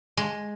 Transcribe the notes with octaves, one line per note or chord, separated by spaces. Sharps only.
G#3